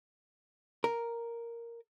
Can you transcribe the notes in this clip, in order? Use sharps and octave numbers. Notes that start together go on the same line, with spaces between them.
A#4